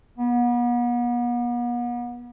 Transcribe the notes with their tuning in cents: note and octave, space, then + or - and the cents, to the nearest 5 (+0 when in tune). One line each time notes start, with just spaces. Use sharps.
B3 -40